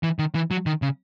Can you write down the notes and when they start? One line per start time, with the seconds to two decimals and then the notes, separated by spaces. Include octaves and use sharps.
0.03 E3
0.19 D#3
0.35 E3
0.51 F#3
0.66 D#3
0.82 C#3